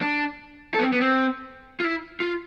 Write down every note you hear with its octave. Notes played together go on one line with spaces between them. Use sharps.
D4
A4
B3
C4
B3
C4
F4
E4
F4